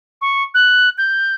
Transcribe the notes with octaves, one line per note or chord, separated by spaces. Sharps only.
C#6
F#6
G6